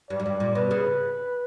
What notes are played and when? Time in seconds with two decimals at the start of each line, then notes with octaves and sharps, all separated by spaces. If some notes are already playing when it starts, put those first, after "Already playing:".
0.10 G2 D5
0.20 F#2
0.26 G2
0.40 A#2
0.55 B2 B4
0.71 C#3